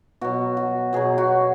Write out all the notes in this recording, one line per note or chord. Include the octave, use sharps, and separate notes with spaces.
B2 F#3 F#4
F#4
B2 F#3 G#4
F#4